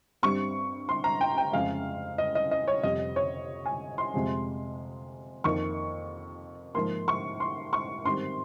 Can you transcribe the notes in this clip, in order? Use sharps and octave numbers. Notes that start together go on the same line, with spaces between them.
G2 G3 C4 C#6
C6
A#5
G5
G5
F2 C#3 G#3 F5
D#5
D#5
D#5
C#5
F2 C3 G3 C4 D#5
C#5
G#5
C6
F2 C3 F3 G#3
F2 D#3 A#3 C#6
G#2 F3 A#3 C6
C#6
C6
C#6
G#2 D#3 G3 C4 C6